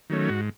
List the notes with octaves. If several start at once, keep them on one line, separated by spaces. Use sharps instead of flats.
D#3 F#3 A3 C#4
G#2 F#4